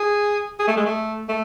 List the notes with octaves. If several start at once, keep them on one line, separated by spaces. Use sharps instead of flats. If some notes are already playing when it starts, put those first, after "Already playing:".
Already playing: G#4
G#4
A3
G#3
A3
A3